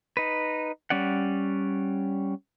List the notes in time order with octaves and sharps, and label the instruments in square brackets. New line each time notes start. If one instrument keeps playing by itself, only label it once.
[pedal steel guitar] D#4 B4
G3 C#4 D5 F#5